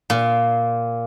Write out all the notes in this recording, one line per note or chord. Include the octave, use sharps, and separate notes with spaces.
A#2